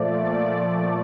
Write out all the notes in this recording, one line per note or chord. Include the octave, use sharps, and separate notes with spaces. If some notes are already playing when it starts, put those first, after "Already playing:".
Already playing: A#2 F3 A3 D5